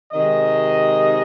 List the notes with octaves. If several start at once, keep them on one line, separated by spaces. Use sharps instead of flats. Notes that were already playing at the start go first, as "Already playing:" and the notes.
C3 D#3 G#3 D#5